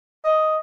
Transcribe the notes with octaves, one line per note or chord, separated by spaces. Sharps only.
D#5